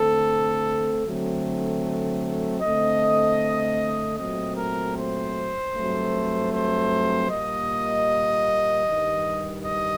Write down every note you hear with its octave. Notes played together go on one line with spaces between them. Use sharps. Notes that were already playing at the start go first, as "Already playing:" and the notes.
Already playing: D3 A3 C4 A4
D3 F#3 A3 C4
D3 A3 C4 D#5
A#2 F#3 A3 C4 D#5
A#4
C5
G2 F#3 A3 C4
C5
A#2 G3 A#3 D#5
G2 D#3 G3
D#5